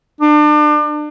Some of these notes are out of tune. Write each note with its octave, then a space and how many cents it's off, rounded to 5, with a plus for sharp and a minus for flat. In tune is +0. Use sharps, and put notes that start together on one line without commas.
D4 +35